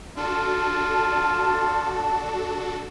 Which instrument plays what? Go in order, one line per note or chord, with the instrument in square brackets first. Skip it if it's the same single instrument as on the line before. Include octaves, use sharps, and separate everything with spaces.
[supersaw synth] D4 F#4 A4 [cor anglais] F4 [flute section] A5